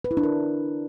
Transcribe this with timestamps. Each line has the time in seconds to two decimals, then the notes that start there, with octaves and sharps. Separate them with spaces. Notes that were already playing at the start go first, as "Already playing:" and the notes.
0.04 B4
0.11 E4
0.17 D4
0.23 A#4